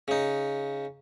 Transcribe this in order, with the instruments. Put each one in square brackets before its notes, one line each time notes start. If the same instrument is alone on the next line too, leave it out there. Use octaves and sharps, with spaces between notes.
[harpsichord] C#3 D#4